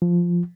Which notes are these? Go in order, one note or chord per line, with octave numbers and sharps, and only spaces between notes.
F3